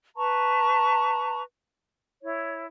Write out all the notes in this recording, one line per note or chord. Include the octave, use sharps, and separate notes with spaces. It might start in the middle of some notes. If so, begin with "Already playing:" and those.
B4 A5 A#5 C#6
E4 C#5